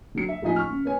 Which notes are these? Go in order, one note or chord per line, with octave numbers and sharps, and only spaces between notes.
D3 F#3 C#7
E5
A1 F3 D#4 D#5 G#5 B6
C#6 F6
C#3
B3 C#5 G#5